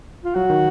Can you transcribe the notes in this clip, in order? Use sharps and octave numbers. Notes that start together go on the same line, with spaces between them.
F4
F#3 F#4
D#3